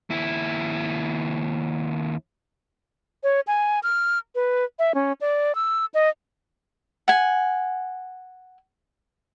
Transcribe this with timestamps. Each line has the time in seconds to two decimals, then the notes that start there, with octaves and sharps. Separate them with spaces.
0.10 D#2 E4
3.23 C#5
3.47 G#5
3.83 F6
4.35 B4
4.79 E5
4.95 C#4
5.21 D5
5.55 E6
5.94 D#5
7.08 F#5 G#5